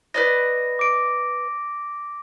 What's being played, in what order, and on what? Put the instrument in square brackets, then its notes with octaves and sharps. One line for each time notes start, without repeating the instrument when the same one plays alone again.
[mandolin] B4 D5 D#5 [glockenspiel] A#6
[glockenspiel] D6 D7